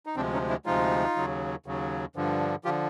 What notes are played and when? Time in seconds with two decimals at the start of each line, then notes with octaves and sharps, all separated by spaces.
0.06 D#4
0.16 D2 C3 F3 G#3 C4 D4
0.33 C#4 D#4
0.49 D4 E4
0.65 D2 C3 F3 G#3 D#4 F4
1.16 D#2 C#3 F#3
1.66 D#2 C#3 F#3
2.16 G2 D3 F3
2.65 D3 F3 F4 G4